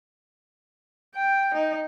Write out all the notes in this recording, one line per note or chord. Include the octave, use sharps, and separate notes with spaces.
G5
D#4